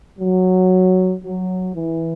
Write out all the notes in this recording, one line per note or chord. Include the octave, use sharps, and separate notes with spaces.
F#3
F#3
E3